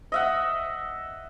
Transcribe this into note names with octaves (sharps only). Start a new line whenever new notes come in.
D#5 E5 F#5